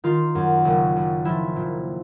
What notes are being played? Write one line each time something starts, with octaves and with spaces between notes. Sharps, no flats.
D#3 F4
F#2
F#1
F#1
F3 E4
A#2